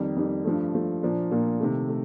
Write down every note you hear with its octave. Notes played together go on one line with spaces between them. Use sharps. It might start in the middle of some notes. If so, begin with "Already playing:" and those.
Already playing: F2 D#3 G3
F2 D#3 G3
G2 F3 A3
G2 F3 A3
A#2 F3 A#3 D4
A#2 F3 A#3 D4
C3 D#3 A3
A3